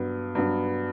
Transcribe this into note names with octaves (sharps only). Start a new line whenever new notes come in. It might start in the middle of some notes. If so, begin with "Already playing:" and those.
Already playing: G2 F#3 B3
G2 F#3 B3